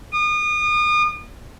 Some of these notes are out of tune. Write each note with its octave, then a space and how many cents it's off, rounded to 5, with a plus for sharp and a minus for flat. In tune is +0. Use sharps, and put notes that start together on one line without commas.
D#6 -35